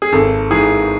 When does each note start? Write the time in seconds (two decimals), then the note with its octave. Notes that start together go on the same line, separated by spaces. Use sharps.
0.02 G#4
0.12 G#1 A4
0.50 G#2 E3 G#4